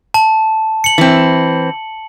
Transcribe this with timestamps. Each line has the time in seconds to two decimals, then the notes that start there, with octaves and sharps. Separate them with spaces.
0.14 A5
0.84 C#7 F#7
0.98 E3 C4